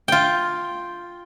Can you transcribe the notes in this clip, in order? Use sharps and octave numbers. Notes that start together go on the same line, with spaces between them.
F4 G5